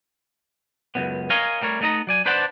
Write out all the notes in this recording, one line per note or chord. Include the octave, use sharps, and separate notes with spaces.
C#2 F#2 B3
A#4 C#5 D#5 F5 G#5
G3 A3 A#4 C#5
A3 B3 D#4 D#5 A#5
F#3 D5 G#5
D4 B4 C5 D5 F#5 A5